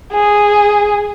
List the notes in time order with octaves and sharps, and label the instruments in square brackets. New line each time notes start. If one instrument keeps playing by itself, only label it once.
[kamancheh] G#4